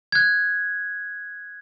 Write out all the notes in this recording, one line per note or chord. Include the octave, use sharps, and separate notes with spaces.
F#6 G#6